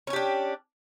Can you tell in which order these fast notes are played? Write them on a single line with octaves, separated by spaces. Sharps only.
C#4 C#5 G4 D4